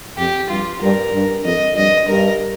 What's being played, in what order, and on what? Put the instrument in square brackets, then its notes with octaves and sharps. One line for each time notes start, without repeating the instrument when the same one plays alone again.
[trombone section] F2 [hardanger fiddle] G4
[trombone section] G2 [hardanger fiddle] F4
[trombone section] G2 [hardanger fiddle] A#4
[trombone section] G2
[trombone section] F2 [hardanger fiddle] D#5
[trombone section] G2 [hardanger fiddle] D#5
[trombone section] G2 [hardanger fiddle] A#4